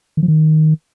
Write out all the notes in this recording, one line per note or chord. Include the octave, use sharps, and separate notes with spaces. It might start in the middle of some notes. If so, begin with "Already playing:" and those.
D#3
F3
D#3